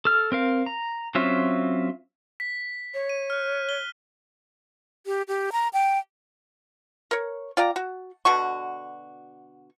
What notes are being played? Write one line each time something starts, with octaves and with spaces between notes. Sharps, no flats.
A4 F6
C4 A#4 F5
A#5
F#3 C4 C#4 F4 E5
B6
C#5
D#7
F6 F#6
G7
G4
G4
A#5
G5
A#4 C#5
F4 D5 G5 A#5
F#4
B2 D3 F#4 C#6